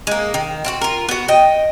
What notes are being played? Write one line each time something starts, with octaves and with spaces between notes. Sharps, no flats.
G#3 A#3
D#3
C4 F4 F#4
F4 A#4
B3 F#4
D#5 G5